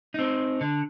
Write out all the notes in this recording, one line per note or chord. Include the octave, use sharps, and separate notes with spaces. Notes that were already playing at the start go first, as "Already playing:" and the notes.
C4 D#4
D3